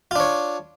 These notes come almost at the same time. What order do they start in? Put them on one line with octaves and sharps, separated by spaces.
F4 D4 C#5